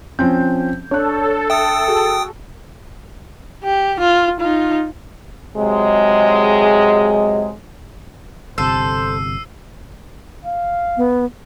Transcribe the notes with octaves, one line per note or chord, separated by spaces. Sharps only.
F3 C4 C#4 G6
D4 A4 C#5 F#6
E5 G5 D#6
F#4 G#4
G4
F4
D#4 F4
C3 F#3 G#3
G1 C3 A4 C5 E6 C7 D#7
F5
B3